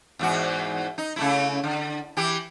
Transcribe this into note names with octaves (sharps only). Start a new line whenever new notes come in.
E2 G#2 F#4
D#4
C#3 A3 E4
D3
E3 G4